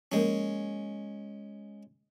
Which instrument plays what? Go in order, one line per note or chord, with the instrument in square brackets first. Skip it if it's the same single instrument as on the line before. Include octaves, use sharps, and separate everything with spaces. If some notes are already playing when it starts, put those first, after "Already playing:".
[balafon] F3 A#3 A#4 [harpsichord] G#3 C#4